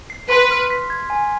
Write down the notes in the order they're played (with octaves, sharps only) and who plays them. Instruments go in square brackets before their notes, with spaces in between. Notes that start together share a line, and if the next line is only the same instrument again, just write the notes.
[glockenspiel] C7
[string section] B4 [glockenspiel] C6
[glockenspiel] F6
B6
G#6
G#5